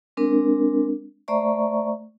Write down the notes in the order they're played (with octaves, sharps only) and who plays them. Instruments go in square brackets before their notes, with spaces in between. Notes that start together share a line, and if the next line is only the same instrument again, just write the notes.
[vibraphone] G#3 C4 D4 A#4
A3 C5 D5 E5 A#5 C#6